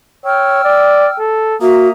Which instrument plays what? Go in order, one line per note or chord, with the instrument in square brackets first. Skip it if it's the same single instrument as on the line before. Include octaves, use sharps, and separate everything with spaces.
[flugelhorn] C#5 [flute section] G5 E6 F6
[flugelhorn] D5
A4
[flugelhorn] A#3 [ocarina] F#4 [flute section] E5 A#5 D#6